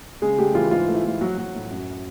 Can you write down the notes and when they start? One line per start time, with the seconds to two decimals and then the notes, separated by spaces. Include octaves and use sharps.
0.22 C#3 G#3 G#4
0.38 G3 A3 G4
0.55 E3 F4
0.71 G#2 F4
0.88 A3
0.94 E4
1.05 A3 F4
1.21 F#3 F#4
1.37 F#3
1.54 A2
1.71 F#2